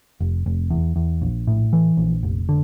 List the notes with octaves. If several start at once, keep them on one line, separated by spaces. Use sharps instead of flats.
F1
F1
E2
E2
A#1
A2
E3
A#1
F1
D3